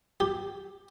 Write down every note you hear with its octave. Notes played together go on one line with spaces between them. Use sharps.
G4